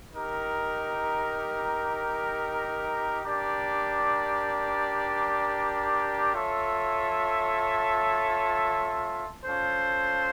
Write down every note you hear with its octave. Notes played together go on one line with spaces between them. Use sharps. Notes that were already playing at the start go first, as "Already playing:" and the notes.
D#4 G4 A#4
D4 G4 A#4 D5
F4 A4 C#5 E5
C#4 F4 A4 C5